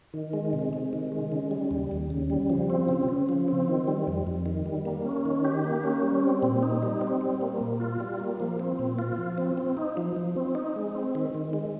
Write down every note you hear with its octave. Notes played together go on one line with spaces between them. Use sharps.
D#3
G#3
C3
C3
D#3
G#3
C#3
G3
D#2
D#2
C#3
G3
F3
C4
C#3
C#3
F3
C4
D#3
G3
F2
F2
D#3
G3
A#3
C#4
D#3
G4
A#3
C#4
G3
C4
A#2
D#4
G3
C4
G3
A#3
A#2
F4
G3
A#3
F3
C4
A#2
F4
F3
C4
C4
D#4
F3
F3
C4
D#4
G#3
C4
D#3
D#3
G#3